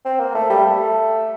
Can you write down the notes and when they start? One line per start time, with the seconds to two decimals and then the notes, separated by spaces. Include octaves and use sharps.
0.05 C4
0.20 A#3
0.35 A3
0.50 G3
0.66 A3